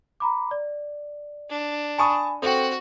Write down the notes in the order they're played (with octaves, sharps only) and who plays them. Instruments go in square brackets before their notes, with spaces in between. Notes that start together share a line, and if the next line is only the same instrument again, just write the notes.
[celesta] A#5 B5 D6
D5
[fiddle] D4
[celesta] G#5 B5 [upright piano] A5 C#6 D#6
[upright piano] C4 [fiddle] F#4 F#5 [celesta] A4 G5